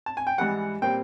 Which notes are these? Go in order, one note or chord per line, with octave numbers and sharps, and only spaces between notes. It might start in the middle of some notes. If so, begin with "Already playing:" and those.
A5
G#5
G5
G#2 E3 G3 F#5
A#2 G3 C4 G5